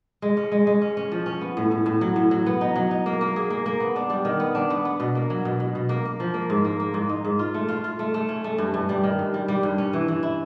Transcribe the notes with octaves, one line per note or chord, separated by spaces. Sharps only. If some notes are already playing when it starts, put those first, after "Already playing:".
G#3
C#4
G#3
G#3
C#4
C#4
F3
C#4
B3
A2
A2
A2
F#3
A2
F#3
B3
D#4
F#3
D#4
A#3
A#3
G#4
A#3
A#3
B3
D4
G3
D#3
B3
D4
B3
B3
B2
A#3
F#3
B2
B2
B2
A#3
A#3
F3
A#3
G#2
A#3
A#3
G#2
D#4
G#2
F4
A3
F4
F4
A3
A3
C#4
A3
G2
G2
G3
D#3
G2
G3
G3
G2
C#4
E3
E3
E4